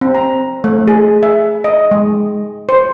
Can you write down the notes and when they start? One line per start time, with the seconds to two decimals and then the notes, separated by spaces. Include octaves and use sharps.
0.01 C4
0.15 A#5
0.64 A3
0.88 G#4
1.23 E5
1.64 D#5
1.91 G#3
2.69 C5